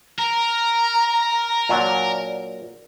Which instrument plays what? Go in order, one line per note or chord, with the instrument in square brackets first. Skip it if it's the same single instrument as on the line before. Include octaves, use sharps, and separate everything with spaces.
[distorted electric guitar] A#4 [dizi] A#5
[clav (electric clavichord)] A#2 F#3 D4